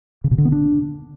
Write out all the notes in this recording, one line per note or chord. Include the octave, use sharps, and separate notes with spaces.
C#3
B2
D3
B3
D4